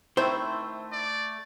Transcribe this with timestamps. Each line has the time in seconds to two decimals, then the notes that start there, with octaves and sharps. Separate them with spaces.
0.17 D#3 A3 C4 E4 C5
0.92 D5